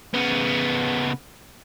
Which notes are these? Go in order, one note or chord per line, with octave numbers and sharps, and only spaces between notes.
C#3 B3